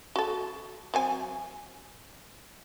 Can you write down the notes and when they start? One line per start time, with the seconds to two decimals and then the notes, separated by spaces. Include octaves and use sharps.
0.16 F#4 A4
0.94 F#3 C4 G#5